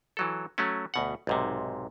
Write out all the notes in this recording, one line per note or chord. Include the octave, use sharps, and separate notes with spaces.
E3 F#3 A4
F#3 A3 C#4
D2 B2 F#5
B1 G#2 C3